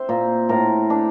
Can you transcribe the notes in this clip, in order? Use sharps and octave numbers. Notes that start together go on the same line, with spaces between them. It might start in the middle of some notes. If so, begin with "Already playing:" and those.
Already playing: C4 C5 E5
A#2
A2 A#4
D4